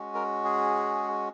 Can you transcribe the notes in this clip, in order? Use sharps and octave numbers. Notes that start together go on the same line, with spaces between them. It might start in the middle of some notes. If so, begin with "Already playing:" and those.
Already playing: G#3 C#4 F#4
A#4
G#4